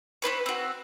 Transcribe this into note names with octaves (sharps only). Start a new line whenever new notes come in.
C4 D4 B4 C#5
C4 F#4